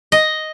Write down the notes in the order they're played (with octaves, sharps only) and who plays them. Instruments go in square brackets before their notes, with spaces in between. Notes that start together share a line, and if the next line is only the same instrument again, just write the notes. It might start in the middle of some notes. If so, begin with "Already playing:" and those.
[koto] D#5